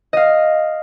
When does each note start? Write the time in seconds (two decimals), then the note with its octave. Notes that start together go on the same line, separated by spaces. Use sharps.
0.13 D#5 F5